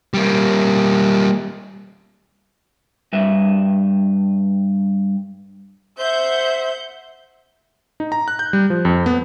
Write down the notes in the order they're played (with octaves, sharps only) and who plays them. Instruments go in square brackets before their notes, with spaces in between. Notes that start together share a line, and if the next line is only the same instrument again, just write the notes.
[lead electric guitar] G3 A#3
[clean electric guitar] G2 B4 E5
[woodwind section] C5 [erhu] E5 [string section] F#5 G6
[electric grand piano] D#4
A#5
F#6
G6
G3
F3
F2
B3